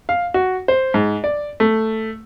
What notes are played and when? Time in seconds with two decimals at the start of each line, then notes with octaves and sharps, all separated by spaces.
0.09 F5
0.34 F#4
0.68 C5
0.94 G#2
1.24 D5
1.60 A3